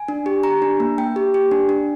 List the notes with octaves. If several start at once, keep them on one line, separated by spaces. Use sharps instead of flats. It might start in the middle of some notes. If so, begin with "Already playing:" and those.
Already playing: G#5
D4
G4
G4 A#5
D4
A#3
A#3 G5
G4
G4
D4
D4